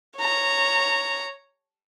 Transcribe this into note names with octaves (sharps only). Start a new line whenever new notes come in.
C#5 A#5